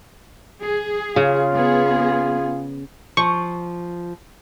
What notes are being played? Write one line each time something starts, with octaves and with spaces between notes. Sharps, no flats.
G#4
C#3 F4
B3 G#4
F3 C#6